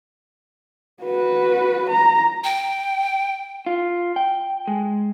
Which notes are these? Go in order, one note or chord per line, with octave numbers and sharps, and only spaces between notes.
F#4 B4
A#5
G5
F4
G5
G#3